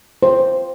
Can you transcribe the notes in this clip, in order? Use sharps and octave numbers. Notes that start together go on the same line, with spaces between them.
C5